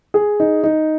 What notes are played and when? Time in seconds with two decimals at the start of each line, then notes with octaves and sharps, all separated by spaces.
0.14 G#4
0.40 D#4
0.64 D#4